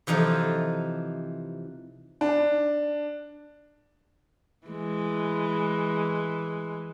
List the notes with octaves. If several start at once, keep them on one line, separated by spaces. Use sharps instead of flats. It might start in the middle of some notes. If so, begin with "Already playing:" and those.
C3 E3 F3 D#4 A4
D4
E3 G#3